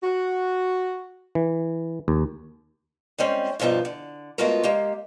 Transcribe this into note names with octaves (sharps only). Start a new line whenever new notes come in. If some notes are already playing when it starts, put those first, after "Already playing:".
F#4
E3
D#2
G3 G#3 C4 C#4
G2 B2 F3 B3 D#4
D3
G#3 A3 B3 F4 F#4 A#4
G#3 A#3 G4